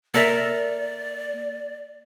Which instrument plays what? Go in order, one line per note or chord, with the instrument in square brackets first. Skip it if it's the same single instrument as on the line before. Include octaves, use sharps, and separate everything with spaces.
[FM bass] A#3 [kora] A4 A#4 E5 [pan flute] D5